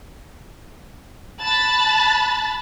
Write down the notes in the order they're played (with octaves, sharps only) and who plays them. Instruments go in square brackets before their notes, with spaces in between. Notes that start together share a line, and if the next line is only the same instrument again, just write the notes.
[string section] A5 B5 F#6 A6